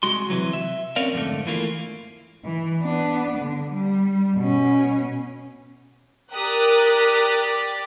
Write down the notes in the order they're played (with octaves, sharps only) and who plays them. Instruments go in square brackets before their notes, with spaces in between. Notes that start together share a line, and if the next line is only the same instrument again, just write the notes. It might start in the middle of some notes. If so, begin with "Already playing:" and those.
[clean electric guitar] C2 G#3 F#4 C6
C3 E3 F#3
E5
C4 C#4 A#4 D5 F5
F2 G#2 D3 A3
E3 A3 A#3 F4
[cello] E3
B3 D4
D3
G3
B2 C#4
[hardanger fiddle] G4 D5 [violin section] A#4 D#6 F#6